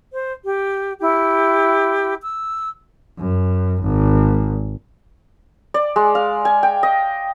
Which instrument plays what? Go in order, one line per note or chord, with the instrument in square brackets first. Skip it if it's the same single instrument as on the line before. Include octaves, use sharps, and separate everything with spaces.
[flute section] C5
G4
E4 G4
E6
[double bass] F#2
G#1
[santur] D5
G#3
F5
G#5
G5
D#5